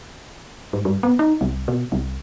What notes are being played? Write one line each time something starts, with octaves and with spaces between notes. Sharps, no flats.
G#2
G2
B3
D#4
C2
B2
C2